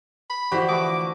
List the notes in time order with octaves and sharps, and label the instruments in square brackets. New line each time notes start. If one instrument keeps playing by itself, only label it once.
[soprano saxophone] B5
[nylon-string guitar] D3 E3 F3 [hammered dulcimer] F#4 [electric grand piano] G4 B6
[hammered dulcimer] A3 B4 [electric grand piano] E5 B5 D#6 [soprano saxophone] D6